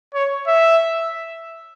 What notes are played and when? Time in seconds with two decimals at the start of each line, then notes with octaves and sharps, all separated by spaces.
0.15 C#5
0.47 E5